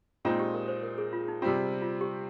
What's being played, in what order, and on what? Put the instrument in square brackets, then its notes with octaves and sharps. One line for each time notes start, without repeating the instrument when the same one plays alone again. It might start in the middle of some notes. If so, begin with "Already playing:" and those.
[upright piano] A#2 G#3 C4 D#4 [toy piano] F4
[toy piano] G4
A#4
C5
A#4
G#4
F4
D#4
[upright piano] C3 G3 C4 [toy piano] F4
[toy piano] F4
G4